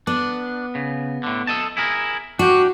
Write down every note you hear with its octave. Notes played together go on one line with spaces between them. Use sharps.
B3 D4
C#3
A2 D3
A4 D#5 A5
E4 G#4 A#4
D4 F#4 G4